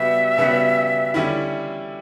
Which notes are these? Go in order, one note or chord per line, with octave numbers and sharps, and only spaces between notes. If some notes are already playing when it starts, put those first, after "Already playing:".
Already playing: C#3 G3 B3 F#4 E5
C#3 G3 B3 F#4
D3 G3 C#4 E4